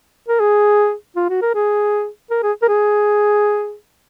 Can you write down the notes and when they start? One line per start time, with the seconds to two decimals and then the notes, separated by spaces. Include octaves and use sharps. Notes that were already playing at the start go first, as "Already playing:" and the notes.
0.29 A#4
0.40 G#4
1.16 F4
1.29 F#4
1.42 A#4
1.55 G#4
2.31 A#4
2.43 G#4
2.63 A#4
2.69 G#4